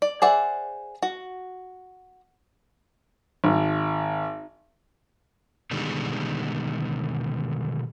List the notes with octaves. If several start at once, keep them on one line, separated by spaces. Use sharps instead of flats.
D5
G#4 C5 D5 E5 F#5
F#4
G#1
B2 D3 D#3 G3 G#3